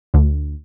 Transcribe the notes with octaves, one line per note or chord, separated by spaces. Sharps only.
D2